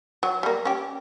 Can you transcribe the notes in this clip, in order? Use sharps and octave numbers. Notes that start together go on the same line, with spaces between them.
F#3
G3 A#3
C#4 G4